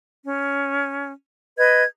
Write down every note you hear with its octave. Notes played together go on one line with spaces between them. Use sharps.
C#4
B4 D#5 G#6